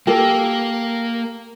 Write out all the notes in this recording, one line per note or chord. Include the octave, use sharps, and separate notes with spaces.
A#3 G4 A4 A#4